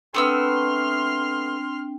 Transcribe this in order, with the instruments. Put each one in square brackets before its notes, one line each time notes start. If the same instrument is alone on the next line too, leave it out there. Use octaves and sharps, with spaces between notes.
[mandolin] A3 B3 E6 [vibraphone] C4 D4 G5 [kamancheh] C6 F6